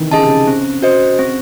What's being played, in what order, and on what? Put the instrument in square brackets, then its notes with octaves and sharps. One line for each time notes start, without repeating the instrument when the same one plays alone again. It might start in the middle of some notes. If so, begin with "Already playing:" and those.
Already playing: [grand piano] C3 D#3 E3
[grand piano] C#3 [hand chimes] G#4 D#5 A5
[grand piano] C3
C#3
[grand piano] C#3 [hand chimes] C4
[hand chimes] F#4 C5 D#5
C4